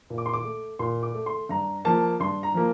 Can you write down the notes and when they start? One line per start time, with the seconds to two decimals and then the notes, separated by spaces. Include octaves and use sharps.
0.10 A#2
0.18 D6
0.26 C6
0.33 D6
0.45 A3
0.79 A#2 C6
1.03 D6
1.15 A3
1.26 C6
1.49 G2 A#5
1.85 F3 A#3 A5
2.20 G2 C6
2.43 A#5
2.54 F3 A#3